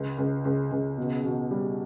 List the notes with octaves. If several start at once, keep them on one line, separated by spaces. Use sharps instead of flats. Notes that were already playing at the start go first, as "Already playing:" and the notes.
Already playing: C#2
C#2
C#2
C#2
B2
B2
G3